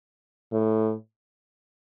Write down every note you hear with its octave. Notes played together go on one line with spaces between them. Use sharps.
A2